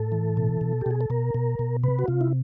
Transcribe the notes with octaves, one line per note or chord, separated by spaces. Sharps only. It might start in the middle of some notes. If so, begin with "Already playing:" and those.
Already playing: A2 A4
E3
B2
B2
G4
B2 G#4
A4
B2 A#4
B2
B2
C3 B4
F#4
C3 F4
E4